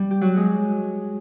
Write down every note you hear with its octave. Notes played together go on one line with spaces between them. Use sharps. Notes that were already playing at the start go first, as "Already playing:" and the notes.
Already playing: G3
G4
F#3 F#4
G#3 G#4